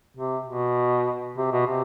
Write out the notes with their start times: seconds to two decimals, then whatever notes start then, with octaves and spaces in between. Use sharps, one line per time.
0.17 C3
0.47 B2
1.37 C3
1.52 B2
1.67 C3